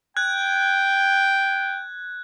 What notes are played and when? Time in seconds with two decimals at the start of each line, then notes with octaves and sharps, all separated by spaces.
0.17 G5 F#6 G#6